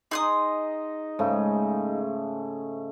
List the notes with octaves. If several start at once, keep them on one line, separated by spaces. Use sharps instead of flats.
D#4 G#4 C6 D#6
G#2 C#3 A3